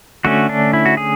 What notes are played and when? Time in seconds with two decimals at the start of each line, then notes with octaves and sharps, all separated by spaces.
0.25 D3 A3 C#4 F#4
0.49 D4
0.73 E4
0.85 F#4
0.97 G#4